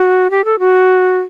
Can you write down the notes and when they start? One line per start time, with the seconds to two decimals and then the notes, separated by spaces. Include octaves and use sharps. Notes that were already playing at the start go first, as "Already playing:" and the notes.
Already playing: F#4
0.31 G4
0.45 A4
0.59 F#4